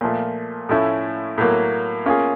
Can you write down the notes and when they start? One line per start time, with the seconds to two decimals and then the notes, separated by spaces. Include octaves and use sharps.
0.01 A#2 F3 A3
0.69 A2 F3 A3 C#4 E4
1.38 A2 F#3 A#3
2.06 A#3 C#4 F4 G#4